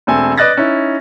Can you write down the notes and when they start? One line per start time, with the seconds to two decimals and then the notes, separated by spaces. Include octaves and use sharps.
0.07 E1 A3 C4 A4 G#5
0.38 B4 D5 D#5 F#6 A6 A#6
0.57 C#4 D#4 E4